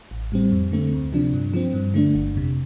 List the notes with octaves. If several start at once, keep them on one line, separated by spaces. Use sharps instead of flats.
A1
A2 G3 C4
F2
D3 A3 C4
D2
C3 F3 D4
G2
F3 C4
G2
D3 A3 D4
G1
F2 C3